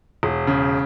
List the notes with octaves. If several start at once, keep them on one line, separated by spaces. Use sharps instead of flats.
E1
C#3